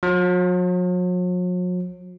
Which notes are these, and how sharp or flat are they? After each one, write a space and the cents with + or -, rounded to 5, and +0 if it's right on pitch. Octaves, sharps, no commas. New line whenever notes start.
F#3 -45